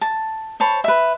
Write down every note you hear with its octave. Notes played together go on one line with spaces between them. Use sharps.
A5
C5 C#5 A5 B5
B4 E5